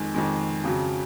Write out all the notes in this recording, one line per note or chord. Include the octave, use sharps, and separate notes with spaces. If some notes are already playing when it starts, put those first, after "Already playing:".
Already playing: F2 D#3 G#3
F2 D#3 G#3
F2 C#3 F#3